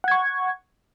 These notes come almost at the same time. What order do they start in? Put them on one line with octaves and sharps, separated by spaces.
F#5 G#6 C#6